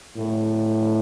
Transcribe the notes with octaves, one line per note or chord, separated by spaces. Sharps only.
A2